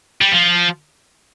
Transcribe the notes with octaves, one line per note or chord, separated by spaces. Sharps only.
G3
F3